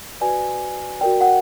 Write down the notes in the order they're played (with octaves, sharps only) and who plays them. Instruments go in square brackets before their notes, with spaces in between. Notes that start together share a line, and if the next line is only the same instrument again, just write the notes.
[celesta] F#4 B4 D5 G#5
F#4 A#4 D5 G5
F#5